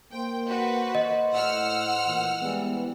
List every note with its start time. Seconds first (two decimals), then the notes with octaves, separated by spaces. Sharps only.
0.13 A#3 C5 G5
0.48 F#4 B4
0.95 D#5
1.33 A2 F#5 E6 F6
2.07 A#2 E3
2.41 E3 G3 G#3 B3